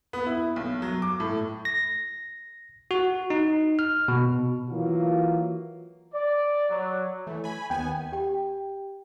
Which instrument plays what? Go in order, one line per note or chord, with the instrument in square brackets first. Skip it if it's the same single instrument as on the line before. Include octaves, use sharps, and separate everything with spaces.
[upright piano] B3
E4
B1
F#3
D6
A2
[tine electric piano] A#6
F#4
D#4
F6
B2
[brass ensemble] E3 F#3 A#3 F4 F#4
[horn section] D5
F#3
[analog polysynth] E3 A3
G#5 B5
[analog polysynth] D#2 B3 G#5 [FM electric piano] G5
[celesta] G4 G5